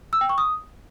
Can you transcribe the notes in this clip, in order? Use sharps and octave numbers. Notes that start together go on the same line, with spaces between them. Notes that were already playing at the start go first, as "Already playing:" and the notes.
E6
G5
C#6
D#6